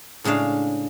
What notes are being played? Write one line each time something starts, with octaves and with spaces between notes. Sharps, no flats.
A2 C#3 G#3 D4 F5